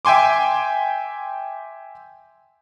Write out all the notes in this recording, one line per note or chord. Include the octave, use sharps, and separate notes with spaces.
E5 G5 G#5 C6 D6